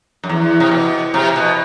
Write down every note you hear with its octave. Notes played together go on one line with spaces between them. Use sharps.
F#2
E2
C3
B2
C3
B2